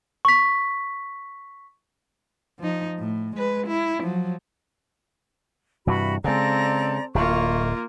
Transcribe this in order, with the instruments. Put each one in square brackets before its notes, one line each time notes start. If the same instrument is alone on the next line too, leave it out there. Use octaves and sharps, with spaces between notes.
[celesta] C#6 B6
[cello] F3 D#4
A2
G#3 B4
E4
F3 F#3
[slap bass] G2 C3 E3 [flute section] F#4 B5
[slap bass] C#3 G#3 [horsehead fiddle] C4 A4 [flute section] D5 A#5
[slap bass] D1 [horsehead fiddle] A#3 F4 [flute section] C#6